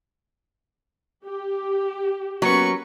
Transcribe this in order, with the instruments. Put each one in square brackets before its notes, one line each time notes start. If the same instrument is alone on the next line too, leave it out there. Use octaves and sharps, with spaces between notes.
[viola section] G4
[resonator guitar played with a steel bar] F#3 [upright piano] A#3 B3 C#4 [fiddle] B4 C#6